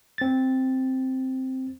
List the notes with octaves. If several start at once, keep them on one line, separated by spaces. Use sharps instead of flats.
C4 A6